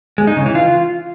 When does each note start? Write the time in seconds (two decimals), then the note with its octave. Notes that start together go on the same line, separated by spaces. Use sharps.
0.18 G#3
0.27 D#4
0.37 C#3
0.46 E3
0.55 F4